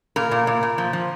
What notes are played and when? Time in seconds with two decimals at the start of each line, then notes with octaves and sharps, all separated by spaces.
0.16 A#2 A#4
0.31 A#2
0.47 A#2
0.63 A#2
0.78 F3
0.93 F3